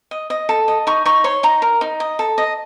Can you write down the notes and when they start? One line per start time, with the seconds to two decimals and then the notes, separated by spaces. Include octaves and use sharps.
0.11 D#5
0.30 D#5
0.49 A4
0.68 D#5
0.87 D#4 C#6
1.05 D#4 C#6
1.24 C#5 C6
1.43 D#4 A#5
1.62 A#4
1.81 D#4
2.00 D#5
2.19 A4
2.38 D#5